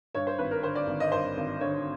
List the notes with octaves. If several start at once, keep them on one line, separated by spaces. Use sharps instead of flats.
G2 C#5
C5
G#1 B4
A#4
D3 C5
D5
G#1
D#5
G2 C5
G#1
D3 C#5